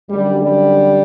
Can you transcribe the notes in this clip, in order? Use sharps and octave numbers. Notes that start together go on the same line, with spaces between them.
F#2 D3 G3
G3